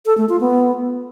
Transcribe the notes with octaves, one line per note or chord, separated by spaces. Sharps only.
A4
A3
F4
B3